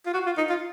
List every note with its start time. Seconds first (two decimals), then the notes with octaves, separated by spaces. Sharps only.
0.06 F4
0.14 F#4
0.26 F4
0.37 D#4
0.49 F4